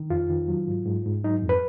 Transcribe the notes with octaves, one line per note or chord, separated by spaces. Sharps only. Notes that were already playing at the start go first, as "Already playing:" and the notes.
Already playing: D#3
F2 F4
D#3
F#3
G#2
G#2
G#2
F#3 D#4
F2
B4